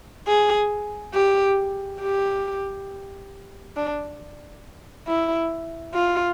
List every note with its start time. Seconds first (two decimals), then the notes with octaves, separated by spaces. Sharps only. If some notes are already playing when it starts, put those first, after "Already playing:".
0.27 G#4
1.15 G4
2.01 G4
3.77 D4
5.08 E4
5.94 F4